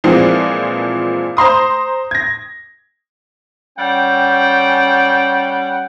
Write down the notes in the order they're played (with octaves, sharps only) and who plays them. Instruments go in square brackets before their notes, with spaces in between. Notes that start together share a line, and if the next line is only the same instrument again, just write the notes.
[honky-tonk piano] A#2 E3 F3 G#3 C4
C5 A#5 C6 D#6
G#6 A#6
[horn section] G3 C#4 F#5 G5